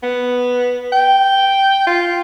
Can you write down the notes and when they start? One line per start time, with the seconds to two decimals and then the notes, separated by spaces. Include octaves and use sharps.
0.03 B3
0.92 G5
1.87 F4